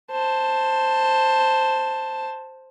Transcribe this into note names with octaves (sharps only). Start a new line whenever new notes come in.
C5 A5